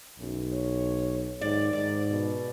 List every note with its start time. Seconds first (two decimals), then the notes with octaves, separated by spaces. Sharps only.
0.19 B1 F#2
0.53 C#5
1.41 G#2 D#3 D5
1.73 G#2 D5
2.09 B2